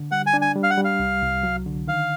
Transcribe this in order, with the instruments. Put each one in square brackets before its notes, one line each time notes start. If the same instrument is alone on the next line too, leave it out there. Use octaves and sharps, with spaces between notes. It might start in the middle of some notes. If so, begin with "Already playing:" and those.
Already playing: [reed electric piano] D3
[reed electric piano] G3 [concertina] F#5
[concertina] G#5
[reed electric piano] D4
[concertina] G#5
[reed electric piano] G3
[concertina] F5
F#5
[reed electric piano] G3
[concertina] F5
[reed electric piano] C2
C2
F#3
D3
[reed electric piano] D#3 [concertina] F5